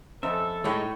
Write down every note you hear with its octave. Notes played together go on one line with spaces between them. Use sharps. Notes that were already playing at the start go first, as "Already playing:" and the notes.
F2 C#4 A4 C5 D#5 E5
A2 G#3 A3 D#4 C#5